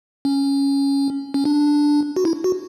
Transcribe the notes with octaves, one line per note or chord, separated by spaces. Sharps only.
C#4
C#4
D4
F#4
E4
F#4